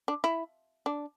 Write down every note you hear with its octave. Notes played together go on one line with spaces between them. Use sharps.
D4
E4
D4